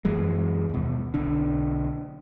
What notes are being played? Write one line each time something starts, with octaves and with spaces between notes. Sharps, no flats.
F#2 E3 F#3 G#3
D#2 B2
B1 D3 D4